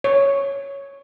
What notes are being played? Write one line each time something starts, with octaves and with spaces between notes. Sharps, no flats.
C#5